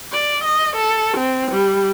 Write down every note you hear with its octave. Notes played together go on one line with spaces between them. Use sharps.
D5
D#5
A4
C4
G3